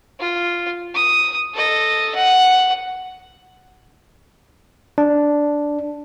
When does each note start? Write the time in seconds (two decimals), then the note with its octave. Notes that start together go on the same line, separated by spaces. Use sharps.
0.20 F4
0.95 D#6
1.54 A4 D#5
2.15 F#5
4.98 D4